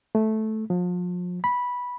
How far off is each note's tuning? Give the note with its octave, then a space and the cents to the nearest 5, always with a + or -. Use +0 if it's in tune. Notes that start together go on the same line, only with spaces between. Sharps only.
A3 -10
F3 +35
B5 -10